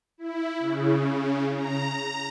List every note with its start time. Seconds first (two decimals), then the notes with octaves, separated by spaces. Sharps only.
0.18 E4
0.59 C#3
1.54 A#5